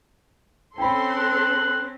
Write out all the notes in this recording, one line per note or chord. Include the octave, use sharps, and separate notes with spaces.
C4 C#4 A4 G5 B5 C6
F#6